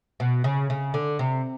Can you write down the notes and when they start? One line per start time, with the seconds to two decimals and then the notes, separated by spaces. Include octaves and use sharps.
0.20 B2
0.44 C#3
0.70 C#3
0.94 D3
1.19 C3